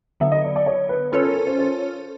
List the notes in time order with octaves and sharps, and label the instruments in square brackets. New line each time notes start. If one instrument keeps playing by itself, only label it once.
[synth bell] D3 F#3 B3 [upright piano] E5
[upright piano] D#5
D5
D5
C#5
B4
[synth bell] C#4 F4 A4 C#5 [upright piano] B4
[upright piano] A#4
A#4
C5
C5